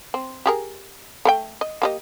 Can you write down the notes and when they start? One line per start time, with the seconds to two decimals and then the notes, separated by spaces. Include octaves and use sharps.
0.14 C4
0.46 G4 G#4 A#4
1.25 A3 A#4 G5
1.61 D#5
1.82 A#3 G4 D#5